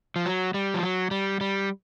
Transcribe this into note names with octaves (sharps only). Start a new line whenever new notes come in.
F3
F#3
G3
F3
F#3
G3
G3